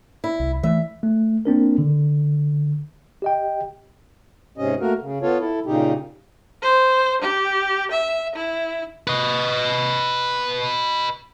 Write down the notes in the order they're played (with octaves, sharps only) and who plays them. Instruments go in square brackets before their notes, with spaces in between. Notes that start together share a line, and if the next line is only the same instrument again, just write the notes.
[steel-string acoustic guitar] E4
[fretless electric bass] C2
[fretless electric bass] E3 A3 [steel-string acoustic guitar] E5
[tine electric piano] A3
A#3 C4 D4 A#4
D3
G4 D#5 G5
[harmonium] G#2 C3 C#4 D#5
A3 A#3 F#4 A#4
C#3
B3 F4 A4 C#5
E4 A4
A#2 C#3 D#4 G4
[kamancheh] C5
G4
E5
E4
[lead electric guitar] B4 D#5